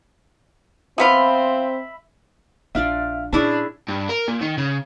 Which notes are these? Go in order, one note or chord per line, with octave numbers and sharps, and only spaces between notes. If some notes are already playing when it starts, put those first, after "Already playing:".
F3 B3 C4 F4 E5 B5
A#1 D4 F4 D5 E5 F5 F6
A#2 C#4 D4 E4 G#4 A5
G2
A#4
A#2
D#3
C#3